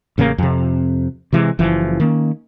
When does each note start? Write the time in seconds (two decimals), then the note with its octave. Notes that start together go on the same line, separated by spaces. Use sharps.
0.18 A1 C#3 E3 A#3
0.38 F2 C3
1.33 C3 E3 G#3
1.59 F#1 E3 F3
2.00 D#3 A#3 C#4